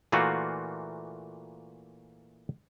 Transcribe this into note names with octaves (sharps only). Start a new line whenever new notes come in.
A#2 E3 A3 A#3 F4 F#4